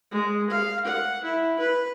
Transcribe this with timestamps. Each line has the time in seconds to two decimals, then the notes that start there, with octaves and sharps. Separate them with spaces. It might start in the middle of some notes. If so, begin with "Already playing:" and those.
0.11 G#3
0.50 F5
0.85 F#5
1.24 E4
1.59 B4